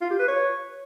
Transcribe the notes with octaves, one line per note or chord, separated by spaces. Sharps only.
F4
G4
B4
C#5